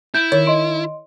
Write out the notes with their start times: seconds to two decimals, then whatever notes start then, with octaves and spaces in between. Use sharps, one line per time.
0.14 E4 G6 D7
0.32 D#3 C#5
0.46 D#5 C6 D7